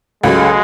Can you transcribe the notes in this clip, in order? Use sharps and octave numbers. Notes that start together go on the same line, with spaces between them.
C#2 C#3 F#3 G#3 A3